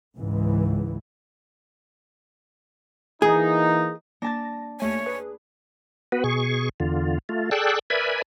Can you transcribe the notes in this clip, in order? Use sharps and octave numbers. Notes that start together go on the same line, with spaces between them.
C#2 G#2 E3
E3 A#3 D#4 G#4
A#3 D4 A5 A6 A#6
D#2 A3 C#5 G#5
G#4 B4
B3 F#4 B4
B2 G#4 C#6
E2 D3 F4
A3 F4
G#4 A4 D5 G5 E6 F#6
A#4 B4 D5 E5 G#5 B5